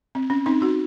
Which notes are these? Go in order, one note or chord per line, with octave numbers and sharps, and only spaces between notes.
C4
C#4
C4 D#4
D#4 F#4